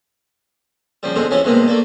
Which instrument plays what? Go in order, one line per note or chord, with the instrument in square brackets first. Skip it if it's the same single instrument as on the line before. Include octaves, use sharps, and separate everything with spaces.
[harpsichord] C#3 F3 G3
B2 D3 G#3 C4
F2 C#3 E3 C#4 G#5 D#6
G2 B2 G#3 A#3 C4
A3 A#3 D4